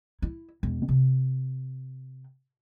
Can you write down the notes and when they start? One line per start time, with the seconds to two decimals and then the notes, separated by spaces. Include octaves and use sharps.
0.22 E4
0.63 E1
0.88 C3